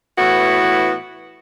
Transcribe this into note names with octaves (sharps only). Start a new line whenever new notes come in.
A2 E3 B3 E4 F#4